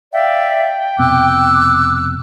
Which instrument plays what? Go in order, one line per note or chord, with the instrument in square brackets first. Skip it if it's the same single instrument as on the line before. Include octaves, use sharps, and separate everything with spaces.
[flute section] D5 E5 F5 [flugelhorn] G5
[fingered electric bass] F1 B2 C4 [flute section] D6 E6 F#6